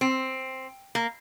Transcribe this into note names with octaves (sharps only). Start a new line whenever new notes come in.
C4
A#3